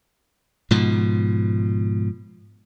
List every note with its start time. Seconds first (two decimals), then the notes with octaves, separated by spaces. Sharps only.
0.71 G#2 B2 F3